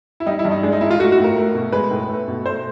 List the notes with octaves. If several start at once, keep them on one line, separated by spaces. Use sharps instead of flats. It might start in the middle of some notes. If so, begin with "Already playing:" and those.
E4
G3 D#4
E4
G2
D#4
G#3 D4
D#4
G#2 E4
F4
A3 F#4
F#4
A2
A#4
A3
B2
G#3 B4
A2
A3
B2
A3 C5